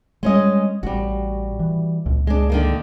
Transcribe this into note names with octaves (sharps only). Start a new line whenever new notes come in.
G3 G#3 C#4 D#5
A1 G3 F#4
E3
C#2 A#2
G#3 D4
D3 D#3 A#3